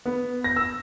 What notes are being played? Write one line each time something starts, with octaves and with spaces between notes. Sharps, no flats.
B3
A#6
E6